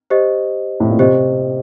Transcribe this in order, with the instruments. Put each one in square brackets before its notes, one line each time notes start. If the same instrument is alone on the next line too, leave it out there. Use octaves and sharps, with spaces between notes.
[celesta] G4 C5 D#5
[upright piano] A2
A#2
[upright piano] C3 [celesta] G4 C5 D#5